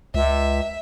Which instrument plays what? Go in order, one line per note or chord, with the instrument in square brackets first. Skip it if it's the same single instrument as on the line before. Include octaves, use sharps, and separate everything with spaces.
[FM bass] C#2 [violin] E5